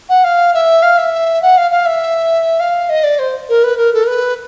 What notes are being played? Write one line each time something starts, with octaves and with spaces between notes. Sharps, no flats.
F#5
F5
E5
F5
E5
F#5
F5
F5
E5
F5
D#5
D5
C5
A#4
B4
A#4
A4
A#4
B4